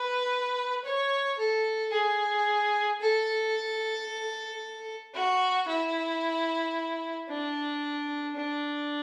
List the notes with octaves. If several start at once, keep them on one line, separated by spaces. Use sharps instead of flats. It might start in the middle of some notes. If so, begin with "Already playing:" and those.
Already playing: B4
C#5
A4
G#4
A4
F#4
E4
D4
D4